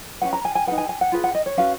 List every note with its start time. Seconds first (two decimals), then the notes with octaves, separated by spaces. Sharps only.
0.22 C#4 F#4 B4 F#5
0.33 A#5
0.45 G#5
0.55 G#5
0.67 G#4 B4 F#5
0.72 D#4
0.78 G#5
0.89 G#5
1.01 F#5
1.12 F4 G#4 B4
1.24 F#5
1.35 D#5
1.46 C#5
1.57 C#4 F#4 B4 F5